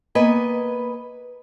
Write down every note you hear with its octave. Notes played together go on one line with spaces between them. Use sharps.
A#3 B3 B4 D#5 G#5